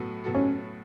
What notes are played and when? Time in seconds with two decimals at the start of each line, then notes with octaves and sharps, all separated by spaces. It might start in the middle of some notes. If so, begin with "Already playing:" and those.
Already playing: A2 F#3 B3 F#4 A4
0.24 A2 F#3 B3 F#4 A4
0.35 C#4